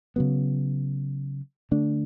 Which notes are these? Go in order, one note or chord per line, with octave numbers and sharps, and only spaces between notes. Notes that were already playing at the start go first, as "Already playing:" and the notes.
C#3 F#3 B3
D3 A3 D4